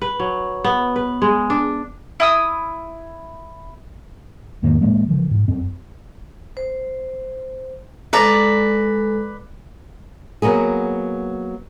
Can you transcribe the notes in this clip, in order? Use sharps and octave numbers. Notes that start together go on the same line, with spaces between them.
B4
F#3
B3
B4
G#3
D4
E4 D#6 E6
E2 G#2 D#3 A#3
A2 E3 G#3 A#3
C#3 E3 F3
G#2
F#2 C4
C5
G#3 A4 B4 D5 A#5
F#3 A#3 B3 G#4